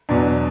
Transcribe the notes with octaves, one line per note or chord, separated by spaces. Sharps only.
E2 B2 F#3 D4